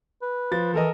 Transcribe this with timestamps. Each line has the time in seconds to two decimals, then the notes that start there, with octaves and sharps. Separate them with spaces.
0.22 B4
0.51 F3 A6
0.74 E3 A4 A#4 D#5